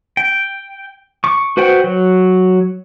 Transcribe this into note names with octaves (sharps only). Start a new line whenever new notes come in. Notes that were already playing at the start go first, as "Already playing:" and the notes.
G5
C#6 D6
F#4 B4 C5 F#5 G5
F#3